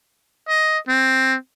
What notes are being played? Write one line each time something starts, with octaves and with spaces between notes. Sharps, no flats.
D#5
C4